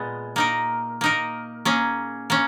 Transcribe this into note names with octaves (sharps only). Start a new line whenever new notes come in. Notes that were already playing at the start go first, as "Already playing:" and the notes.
Already playing: A#2 G#3 B3
A#3 D#4 A#4
A#3 D#4 A#4
A#3 C#4 G#4
A#3 C#4